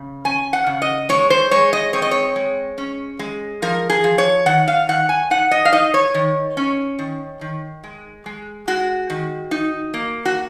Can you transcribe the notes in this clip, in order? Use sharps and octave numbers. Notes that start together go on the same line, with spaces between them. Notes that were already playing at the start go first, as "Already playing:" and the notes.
Already playing: C#3
C#4 G#5
F#5
C#3
D#5
G#3 C#5
C5
G#3 C#5
D#5
C4 C#5
D#5
C#5
G#3
C#4
G#3
F3 A#4
G#4
F3
C#5
D#3 F#5
F5
D#3 F#5
G#5
D#4 F#5
D#5
F5
D#4 D#5
C#5
D#3
C#4
D#3
D#3
G#3
G#3
G#3 F#4
D#3
D#4
A#3
F#4